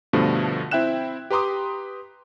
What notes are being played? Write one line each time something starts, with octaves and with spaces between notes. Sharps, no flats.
G2 B2 D3 F3 A3
C4 E4 E5 G5 F#6 E7
G4 B4 A#5 C6 D6 D#6